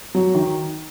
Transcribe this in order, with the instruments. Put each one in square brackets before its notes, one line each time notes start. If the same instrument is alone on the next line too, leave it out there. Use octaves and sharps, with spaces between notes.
[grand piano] F#3
D#3